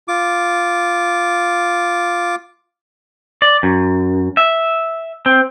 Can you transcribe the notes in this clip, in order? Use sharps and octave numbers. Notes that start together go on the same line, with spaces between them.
F4 D6
D5
F#2
E5
C4